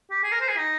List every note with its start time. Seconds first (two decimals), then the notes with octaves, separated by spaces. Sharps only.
0.11 G4
0.23 G#4
0.32 A#4
0.41 C5
0.48 G#4
0.57 D#4